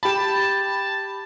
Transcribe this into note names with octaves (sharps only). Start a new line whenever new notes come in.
G4 A5 B5